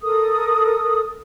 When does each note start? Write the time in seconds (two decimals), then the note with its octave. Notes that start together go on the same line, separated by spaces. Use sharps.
0.01 A4 A#4 D#6